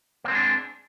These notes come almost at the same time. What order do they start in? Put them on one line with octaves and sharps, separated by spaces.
A#3 C4 G#3 D4